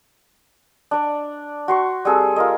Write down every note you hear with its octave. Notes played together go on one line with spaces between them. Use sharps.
D4 D5
F#4 C6 C#6
G3 C4 G#4 A4
F4 A#4 D#5